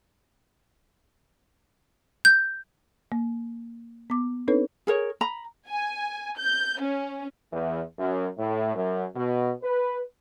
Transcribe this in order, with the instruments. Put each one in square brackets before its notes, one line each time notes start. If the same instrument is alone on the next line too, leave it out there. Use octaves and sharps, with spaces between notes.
[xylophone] G6
[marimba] A#3
B3 D6
C4 D4 D#4 A4 B4 C#5
[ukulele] G#4 A#4 C#5
A#5 B5
[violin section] G#5
G6
C#4
[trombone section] E2
F#2
A2
F#2
B2
B4